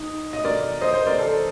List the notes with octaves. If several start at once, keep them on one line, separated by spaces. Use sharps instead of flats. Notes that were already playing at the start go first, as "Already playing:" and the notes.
Already playing: D#4
D#5
A#4 D5
C5 D#5
C5 D#5
A#4 D5
A4 C5